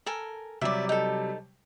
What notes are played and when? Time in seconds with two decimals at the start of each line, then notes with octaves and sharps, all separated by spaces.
0.06 A4 A#4 G#5
0.61 C3 F#3 G3 D5 E5
0.89 D#4 A4